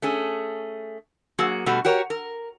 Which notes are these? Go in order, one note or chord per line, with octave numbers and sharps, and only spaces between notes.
A3 C#4 G#4
F#3 A#3 F#4 G#4
B2 G3 A3 F#4
F#4 G4 A#4 C#5
A#4